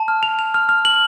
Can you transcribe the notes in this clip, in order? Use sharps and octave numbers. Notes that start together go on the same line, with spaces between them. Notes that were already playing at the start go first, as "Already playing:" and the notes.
Already playing: A5
F6
F7
F7
F6
F6
F#7